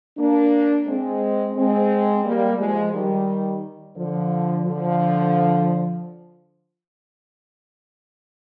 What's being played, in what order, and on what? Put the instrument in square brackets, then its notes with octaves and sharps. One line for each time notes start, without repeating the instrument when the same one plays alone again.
[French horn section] A#3 D4
G#3 C4
G#3 C4
G3 A#3
F3 G#3
D#3 G3
D3 F3
D3 F3